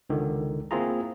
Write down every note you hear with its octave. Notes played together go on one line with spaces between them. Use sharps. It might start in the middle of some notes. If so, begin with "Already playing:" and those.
C#2 D3 D#3
A#3 C4 E4 F4 G#4 A#5